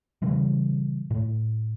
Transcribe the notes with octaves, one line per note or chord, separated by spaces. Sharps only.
A#2 C#3 E3 G3
A2